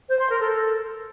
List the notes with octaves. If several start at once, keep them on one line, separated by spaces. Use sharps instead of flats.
C5
C6
A#4
A4